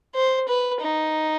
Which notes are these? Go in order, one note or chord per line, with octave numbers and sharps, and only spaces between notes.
C5
B4
D#4